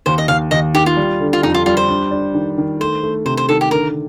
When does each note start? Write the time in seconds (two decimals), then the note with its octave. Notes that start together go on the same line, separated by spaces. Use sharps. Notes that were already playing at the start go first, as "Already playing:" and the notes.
0.06 D#2 C5
0.18 D#5
0.28 D#2 F5
0.51 D#2 D#5
0.74 D#3 G4
0.86 F4
0.97 G3
1.20 D3
1.33 F4
1.43 F2 D#4
1.54 F4
1.66 G3 F4
1.77 C5
1.88 D4
2.11 D4
2.34 D#3
2.58 D#3
2.80 A3 C5
3.03 A3
3.25 C3 C5
3.37 C5
3.49 D#3 A4
3.61 G4
3.71 D3 A#4